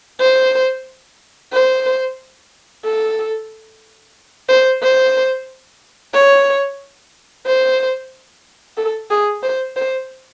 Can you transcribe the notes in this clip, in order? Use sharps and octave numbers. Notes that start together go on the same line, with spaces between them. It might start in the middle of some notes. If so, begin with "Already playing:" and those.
C5
C5
A4
C5
C5
C#5
C5
A4
G#4
C5
C5